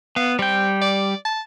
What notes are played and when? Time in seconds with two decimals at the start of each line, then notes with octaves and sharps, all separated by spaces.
0.16 B3 F5
0.39 G3 C4 G5
0.82 D5
1.25 A5